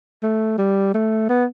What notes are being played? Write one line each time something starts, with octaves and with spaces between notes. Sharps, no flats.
A3
G3
A3
B3